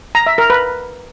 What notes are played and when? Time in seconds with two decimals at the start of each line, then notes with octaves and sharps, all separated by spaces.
0.15 A#5
0.26 E5
0.38 A#4
0.50 B4